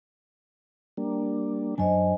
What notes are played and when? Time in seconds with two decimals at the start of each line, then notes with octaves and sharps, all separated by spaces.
0.97 G3 A#3 D4
1.78 F#2 F#3 D4 C5 D#5 G#5